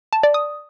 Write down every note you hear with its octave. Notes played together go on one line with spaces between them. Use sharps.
A5
D5
D#6